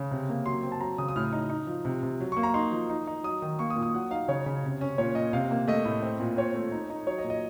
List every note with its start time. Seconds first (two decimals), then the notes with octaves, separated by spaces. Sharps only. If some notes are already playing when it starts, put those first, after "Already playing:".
Already playing: C#3
0.11 C3
0.29 A#3
0.46 F#3 C6
0.63 C4
0.72 A5
0.81 F#3 A#5
0.98 C#3 D#6
1.08 D#6
1.16 A2 F6
1.33 D#4
1.50 D#4
1.67 F3
1.85 C3
2.03 C3
2.20 F#3
2.32 A#3 C#6
2.43 A#5
2.54 D#4 C6
2.72 F3
2.90 D#4
3.07 D#4
3.24 F#3 D#6
3.42 D#3
3.59 A#3 C#6
3.70 D#6
3.76 A#2
3.83 D#6
3.94 F#3 F#5
4.11 D#4 F5
4.28 C#3 C#5
4.46 C#3
4.64 C3
4.81 C#4
4.98 A#2 C#5
5.15 A#2 D#5
5.33 C3 F5
5.51 A#3
5.68 A3 D#5
5.85 A2
6.02 C4
6.20 A#2
6.37 C4 C#5
6.55 A3
6.72 D#4
6.90 D#4
7.07 F#3 C#5
7.18 D#5
7.24 A#2
7.30 D#5